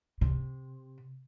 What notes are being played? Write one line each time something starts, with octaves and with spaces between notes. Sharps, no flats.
C3